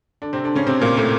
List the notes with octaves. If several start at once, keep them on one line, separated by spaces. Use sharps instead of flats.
D3 D4
C3 C4
D3 D4
C#3 C#4
C3 C4
A#2 A#3
A2 A3